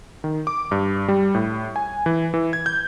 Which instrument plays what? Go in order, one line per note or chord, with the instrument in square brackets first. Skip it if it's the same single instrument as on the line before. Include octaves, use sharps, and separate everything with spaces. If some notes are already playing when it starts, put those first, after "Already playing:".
[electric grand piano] D#3
D6
G2
G3
A2
G#5
E3
E3
G#6
G6